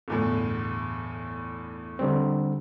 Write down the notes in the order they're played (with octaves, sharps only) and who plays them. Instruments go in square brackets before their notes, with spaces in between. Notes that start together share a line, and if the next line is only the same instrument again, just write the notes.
[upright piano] G1 E2 A2
[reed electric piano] D3 G3 C4